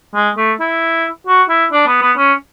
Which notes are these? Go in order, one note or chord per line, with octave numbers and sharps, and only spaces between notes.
G#3
A3
E4
F#4
E4
D4
B3
B3
C#4